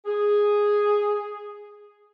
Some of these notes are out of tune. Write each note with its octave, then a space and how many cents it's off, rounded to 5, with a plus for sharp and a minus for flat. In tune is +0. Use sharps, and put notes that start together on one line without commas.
G#4 -5